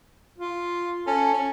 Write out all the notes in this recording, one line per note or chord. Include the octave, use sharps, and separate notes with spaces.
F4
C#4 A4
C#4